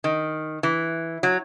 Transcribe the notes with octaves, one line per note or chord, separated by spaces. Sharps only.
D#3
E3
F#3